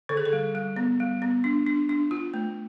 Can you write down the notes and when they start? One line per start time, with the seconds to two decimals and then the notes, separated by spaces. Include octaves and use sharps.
0.09 D3 A4
0.17 G#4
0.25 A4
0.33 G3
0.55 G3
0.76 B3
1.00 G3
1.22 B3
1.44 D4
1.67 D4
1.89 D4
2.11 F4
2.34 A3